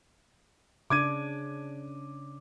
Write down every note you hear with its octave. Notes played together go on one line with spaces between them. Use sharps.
C#3 D4 D6 G#6 D#7